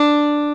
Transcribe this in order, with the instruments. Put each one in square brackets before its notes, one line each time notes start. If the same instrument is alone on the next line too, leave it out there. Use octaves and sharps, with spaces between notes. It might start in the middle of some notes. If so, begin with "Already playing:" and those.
Already playing: [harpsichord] D4